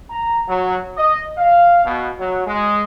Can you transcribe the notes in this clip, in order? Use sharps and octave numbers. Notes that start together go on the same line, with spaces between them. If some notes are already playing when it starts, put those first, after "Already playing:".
A#5
F#3
D#5
F5
B2
F#3
G#3